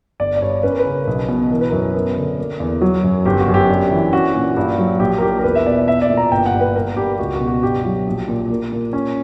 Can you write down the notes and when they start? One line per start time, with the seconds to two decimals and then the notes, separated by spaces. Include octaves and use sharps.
0.20 G1 D5
0.36 D5
0.42 G2 C#5
0.63 C#4 B4
0.72 A#4
0.79 B4
0.85 C#3
1.07 B1
1.29 B2
1.50 E3 A#4
1.61 B4
1.70 F#2 A#4
1.95 B3
2.17 D3
2.39 A#3
2.60 E2
2.81 F#3
3.04 F#2
3.25 G1 G4
3.40 F#4
3.48 F#2
3.54 G4
3.69 D4
3.91 E3
4.12 C#4 F#4
4.35 A#2
4.57 G2
4.78 F#3
5.00 A#1 G4
5.18 A#4
5.22 A#2 G4
5.39 A#4
5.43 E2 B4
5.55 E5
5.66 B2 D5
5.87 B3 E5
6.02 D5
6.10 A#2
6.17 A#5
6.32 G1 G5
6.46 F#5
6.54 G2
6.61 B4
6.74 A#3 A#4
6.97 G2 G4
7.19 C#2 F#4
7.33 F#4
7.40 B2
7.48 F#4
7.62 G2 G4
7.85 F#3
8.07 A#1
8.28 A#2
8.50 A#3
8.72 A#2
8.93 C#4